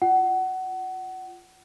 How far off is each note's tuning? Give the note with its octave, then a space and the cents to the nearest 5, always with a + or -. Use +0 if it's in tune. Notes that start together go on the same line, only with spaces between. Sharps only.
F4 +0 F#5 +20